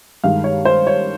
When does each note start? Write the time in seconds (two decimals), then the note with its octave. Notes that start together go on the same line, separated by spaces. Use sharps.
0.24 G2 D#3 G#3 F5
0.44 C#5
0.65 C5
0.87 C#5